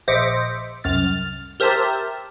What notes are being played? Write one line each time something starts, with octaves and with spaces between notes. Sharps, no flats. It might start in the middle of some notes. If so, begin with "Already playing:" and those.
A#1 C5 D#5 E5 D6 C#7
C2 F#2 F6 A6
G4 A#4 C5 E5 A5